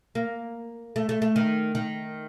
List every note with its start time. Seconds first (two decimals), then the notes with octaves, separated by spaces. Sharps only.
0.15 A#3
0.96 A3
1.09 A3
1.22 A3
1.36 D#3
1.75 D#3